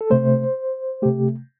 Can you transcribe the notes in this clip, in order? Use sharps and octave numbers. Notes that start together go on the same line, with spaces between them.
A4
C3 A3 C5
C3 A3 G4